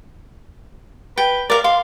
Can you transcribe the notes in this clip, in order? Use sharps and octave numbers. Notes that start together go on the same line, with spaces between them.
B4 G5
A#4 D5 F5
F5 C6